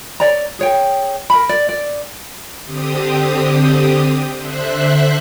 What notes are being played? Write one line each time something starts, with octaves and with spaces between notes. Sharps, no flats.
C#5 D5 A#5
G#4 C#5 G5
A#4 B5
D5
D5
D3 C4 G4 D#6
D3 C5 E5 F#6